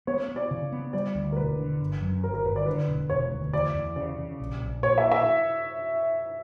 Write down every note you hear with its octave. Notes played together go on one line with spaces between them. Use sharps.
B3 C#5
B3
D5
C#3
B3
G3 D5
D2
A#4
E1 B4
D3
G1
F#2
G1 A#4
A#4
G1 B4
D5
D3 B4
E1
E1 C#5
D2
E2 D5
E2
C#3 D5
C#3
A#1
A#1
A#2 C#5
E5
E5